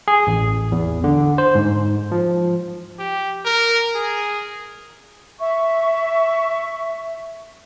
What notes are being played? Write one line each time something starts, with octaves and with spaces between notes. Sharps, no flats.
G#4
A1
E2
D3
C5
G#2
F3
G4
A#4
G#4
E5 C#6